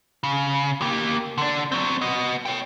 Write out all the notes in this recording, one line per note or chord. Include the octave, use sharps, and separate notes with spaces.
C#3
A#3 G4
D3 D4
F#3 C4
B3 D#5
C#5 G5